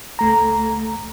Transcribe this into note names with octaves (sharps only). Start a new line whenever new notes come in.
C#2 A3 A#5